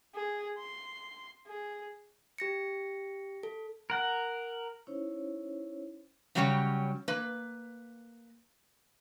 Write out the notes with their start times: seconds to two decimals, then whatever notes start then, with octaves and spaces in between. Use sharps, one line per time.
0.15 G#4
0.59 C6
1.47 G#4
2.38 G4 A#6 C#7
3.43 A4
3.90 A#4 F#5
4.87 C#4 D#4 E4 C5 C#5
6.35 C#3 F#3 G3 C#4 C#5 G5
7.08 A#3 B4